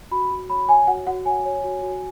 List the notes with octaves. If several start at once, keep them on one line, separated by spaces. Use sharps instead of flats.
F#4 B5
F#4
C#5 B5
C#5 G#5
F#4 F#5
F#4 F#5
C#5 G#5
C#5
F#4
F#4